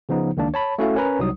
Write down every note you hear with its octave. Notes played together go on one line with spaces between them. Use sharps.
C#3 F3 B3 D#4
C#2 D#3 A#3 D4
C#5 A5 B5
A3 C#4 E4 F#4 A4 F5
C#4 A#4 B4 A#5
C2 F#3 D#4 D#6